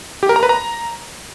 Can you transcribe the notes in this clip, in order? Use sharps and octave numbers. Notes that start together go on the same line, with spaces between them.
G4
A#4
A#5
B4
A#5